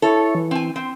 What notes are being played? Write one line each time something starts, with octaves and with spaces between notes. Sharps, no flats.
E4 A4 C#5
E3
C4 G#5
C4